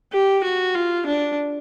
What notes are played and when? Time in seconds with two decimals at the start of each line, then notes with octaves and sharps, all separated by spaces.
0.13 G4
0.44 F#4
0.75 F4
1.06 D4